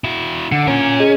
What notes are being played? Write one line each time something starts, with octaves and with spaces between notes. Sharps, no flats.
E4 F#4
D3
C#4 F4 A#4
G#4 D#5